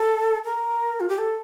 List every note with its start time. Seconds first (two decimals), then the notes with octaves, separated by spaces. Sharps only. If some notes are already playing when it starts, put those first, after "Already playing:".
Already playing: A4
0.45 A#4
1.00 F4
1.09 G4
1.18 A4